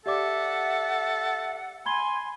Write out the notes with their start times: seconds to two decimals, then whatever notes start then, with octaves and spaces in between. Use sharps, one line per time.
0.06 G4 A4 D5 E5 F#5 D6
1.86 G#5 B5 C6 G#6 G7